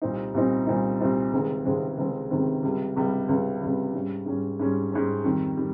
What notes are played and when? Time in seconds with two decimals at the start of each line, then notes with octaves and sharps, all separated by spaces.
0.02 C2 A#2 G3 C4 D#4
0.34 C2 A#2 G3 C4 D#4
0.67 C2 A#2 G3 C4 D#4
1.00 C2 A#2 G3 C4 D#4
1.33 C#2 C3 D#3 G#3 C4
1.65 C#2 C3 D#3 G#3 C4
1.98 C#2 C3 D#3 G#3 C4
2.30 C#2 C3 D#3 G#3 C4
2.63 C#2 C3 G3
2.96 C#2 C3 G3
3.29 C#2 C3 G3
3.61 C#2 C3 G3
3.94 G#2 G3 C#4
4.26 G#2 G3 C#4
4.59 G#2 G3 C#4
4.92 G#2 G3 C#4
5.24 F2 D#3 G3
5.58 D#3 G3